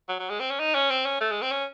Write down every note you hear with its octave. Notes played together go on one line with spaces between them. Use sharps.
F#3
F#3
G#3
C4
C#4
D#4
C#4
C4
C#4
A3
G#3
C4
C#4